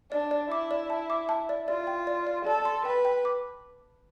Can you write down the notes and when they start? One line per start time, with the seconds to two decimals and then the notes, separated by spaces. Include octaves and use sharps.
0.12 D4 D5
0.31 D5
0.51 E4 D6
0.71 D5
0.90 A5
1.10 D6
1.29 A5
1.49 D5
1.68 F4 D5
1.87 G5
2.07 D5
2.27 D5
2.46 A4 D5
2.65 C6
2.85 B4 G5
3.05 G5
3.25 D6